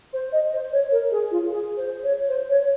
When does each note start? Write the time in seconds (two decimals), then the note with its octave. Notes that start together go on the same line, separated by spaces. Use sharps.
0.13 C5
0.32 D#5
0.53 C5
0.72 C#5
0.91 A#4
1.11 G#4
1.31 F4
1.50 G#4
1.77 C5
2.03 C#5
2.29 C5
2.49 C#5